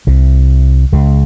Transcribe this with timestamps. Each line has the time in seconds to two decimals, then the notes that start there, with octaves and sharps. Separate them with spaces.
0.07 C2 C3
0.93 C#2 C#3